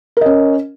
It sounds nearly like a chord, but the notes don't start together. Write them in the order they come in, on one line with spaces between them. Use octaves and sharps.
A#4 D#5 C#4